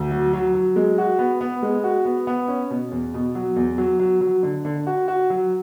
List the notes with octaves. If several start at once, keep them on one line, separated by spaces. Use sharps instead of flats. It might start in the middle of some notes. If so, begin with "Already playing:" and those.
Already playing: D2
F#3
F#3
F#3
G#3
F#4
B3
B3
G#3
F#4
B3
B3
C#4
B2
E2
B2
F#3
E2
F#3
F#3
F#3
D3
D3
F#4
F#4
F#3